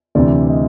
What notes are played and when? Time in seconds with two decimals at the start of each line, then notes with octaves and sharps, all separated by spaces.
0.15 D2 C3 E3 D5
0.50 D#5